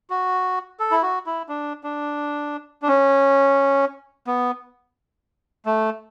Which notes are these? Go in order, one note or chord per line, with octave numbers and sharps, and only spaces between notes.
F#4
A4
E4
F#4
E4
D4
D4
D4
C#4
B3
A3